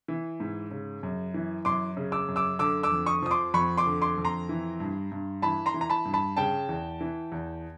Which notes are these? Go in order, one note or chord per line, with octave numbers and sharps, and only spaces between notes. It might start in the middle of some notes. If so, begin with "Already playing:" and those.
E3
G#2
C#3
F#2
E3
F#2 C6 D6
C#3
D6 E6
F#2
D6 E6
D3 D6 E6
D6 E6
F2
C#6 D#6
F3 D#6
C6 D6
F2 B5 C#6
C6 D6
D3
C6 D6
F2
A#5 C6
E3
G2
G2
E3 A5 B5
A#5 C6
E3
A#5
A5 B5
G2
A5 B5
C#3 G5 A5
E2
E3
E2